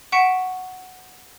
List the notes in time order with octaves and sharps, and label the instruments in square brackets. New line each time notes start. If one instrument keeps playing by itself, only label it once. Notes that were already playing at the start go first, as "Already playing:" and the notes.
[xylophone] F#5 C#6 B6 C#7 D7 E7